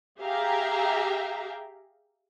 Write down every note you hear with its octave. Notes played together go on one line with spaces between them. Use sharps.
G4 G#4 E5 F5 G5 A#5